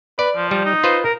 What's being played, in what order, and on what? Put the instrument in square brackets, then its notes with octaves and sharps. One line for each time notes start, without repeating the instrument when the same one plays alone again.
[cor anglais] B4 [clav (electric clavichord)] D5
[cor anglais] F3
[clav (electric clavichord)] G3
[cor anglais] D#4
[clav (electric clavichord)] F4 B4 C5
[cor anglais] A#4